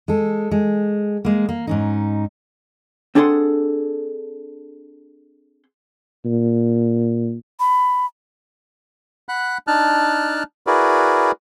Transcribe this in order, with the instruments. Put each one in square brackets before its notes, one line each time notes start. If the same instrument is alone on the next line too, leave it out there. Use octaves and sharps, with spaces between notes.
[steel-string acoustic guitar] G#3 A4
G#3
G#3 A#3
A#3
G#2 C#4 D#4
[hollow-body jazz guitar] C4 D4 G#4 A4 F#5 C6
[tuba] A#2
[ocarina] B5
[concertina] F#5 B5 F#6
D4 D#4 A5 F6 F#6
E4 F#4 G#4 A#4 B4 D5